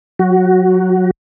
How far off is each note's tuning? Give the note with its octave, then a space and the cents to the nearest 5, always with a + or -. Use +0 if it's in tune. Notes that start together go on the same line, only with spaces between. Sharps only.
F#3 -15 F#4 +10